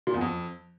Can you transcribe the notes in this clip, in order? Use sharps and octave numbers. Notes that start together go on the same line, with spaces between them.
A#2
E2
F2